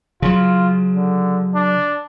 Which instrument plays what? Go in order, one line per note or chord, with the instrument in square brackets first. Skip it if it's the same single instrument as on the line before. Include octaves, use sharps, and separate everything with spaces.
[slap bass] C#3 F#3 [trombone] F4
[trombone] D3
D4